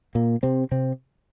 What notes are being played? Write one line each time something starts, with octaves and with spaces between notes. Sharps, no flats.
A#2 A#3
C3 C4
C3 C4